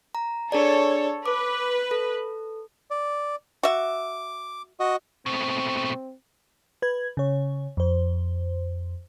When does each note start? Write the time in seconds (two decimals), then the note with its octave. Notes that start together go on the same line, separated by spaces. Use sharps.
0.15 A#5
0.52 D4 G#4 A4 C#5 D5
1.26 B4 D6
1.91 A4
2.90 D5
3.63 F#4 E5 D6
4.80 F#4 D#5
5.26 B2 A3 C4
6.82 B4 G#6
7.17 C#3 C#5
7.77 F2 C5